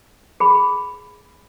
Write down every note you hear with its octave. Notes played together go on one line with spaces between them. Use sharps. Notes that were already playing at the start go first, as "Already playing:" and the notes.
G#4 B5